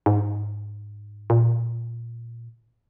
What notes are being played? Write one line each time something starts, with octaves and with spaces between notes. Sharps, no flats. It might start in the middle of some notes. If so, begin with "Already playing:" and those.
G#2
A#2